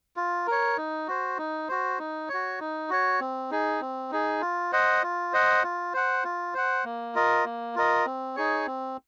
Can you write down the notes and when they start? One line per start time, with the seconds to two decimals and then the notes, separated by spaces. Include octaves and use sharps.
0.16 F4
0.47 A#4 C#5
0.77 D#4
1.08 F#4 C5
1.38 D#4
1.69 F#4 C5
1.98 D#4
2.29 F#4 C#5
2.60 D#4
2.90 F#4 C#5
3.20 C4
3.51 D#4 G#4
3.81 C4
4.11 D#4 G#4
4.41 F4
4.72 C5 D#5 F#5
5.03 F4
5.33 C5 D#5 F#5
5.63 F4
5.94 C5 F#5
6.24 F4
6.54 C5 F#5
6.85 A#3
7.15 F4 A#4 D#5
7.45 A#3
7.75 F4 A#4 D#5
8.06 C4
8.36 D#4 G#4 C#5
8.67 C4